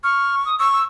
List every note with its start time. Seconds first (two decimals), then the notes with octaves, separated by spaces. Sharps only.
0.04 C#6 F6
0.45 D#6
0.59 C#6 E6
0.73 E6